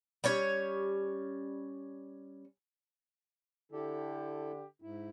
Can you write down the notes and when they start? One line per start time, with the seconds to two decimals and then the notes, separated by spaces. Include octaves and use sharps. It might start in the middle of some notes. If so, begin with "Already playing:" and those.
0.24 G3 C#4 C#5
3.72 D3 E4 G4 A4
4.82 G#2 E4